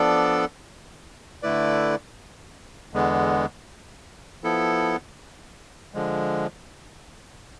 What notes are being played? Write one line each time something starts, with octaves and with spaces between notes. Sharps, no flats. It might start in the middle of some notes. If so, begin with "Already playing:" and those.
Already playing: F3 B3 D4 A4 D5
D3 A3 E4 B4 D5
E2 D3 G#3 B3
F3 B3 E4 A4
D3 F3 G#3